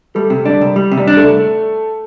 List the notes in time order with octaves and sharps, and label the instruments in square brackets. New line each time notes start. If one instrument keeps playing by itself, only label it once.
[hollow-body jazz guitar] G3 [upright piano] A3
[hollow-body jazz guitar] C3
[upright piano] G3 [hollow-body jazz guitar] D4
[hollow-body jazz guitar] C2
G3
C3
[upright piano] G3
[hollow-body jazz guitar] D4
[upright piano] A3
[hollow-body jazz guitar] C2